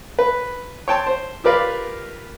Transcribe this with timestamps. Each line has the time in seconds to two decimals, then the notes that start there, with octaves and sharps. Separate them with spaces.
0.19 B4
0.88 C#5 G5 A5 C6
1.07 C5
1.44 F4 G4 A#4 B4 D5 F5